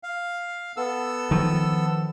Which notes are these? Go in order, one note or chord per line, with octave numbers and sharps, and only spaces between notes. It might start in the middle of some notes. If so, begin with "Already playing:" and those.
F5
B3 A4 E6
D#3 F3